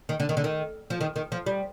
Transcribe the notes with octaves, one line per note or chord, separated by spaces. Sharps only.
D#3
D3
D#3
D3
D#3
F3
D#3
D#3
F3
G3